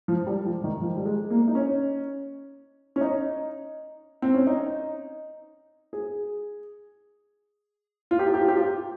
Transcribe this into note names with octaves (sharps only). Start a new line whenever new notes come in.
F3
G3
F3
D#3
F3
G3
G#3
A#3
D#4
C#4
C#4
D#4
C4
C#4
D#4
G#4
F4
G4
F4
G4
F4
G4
F4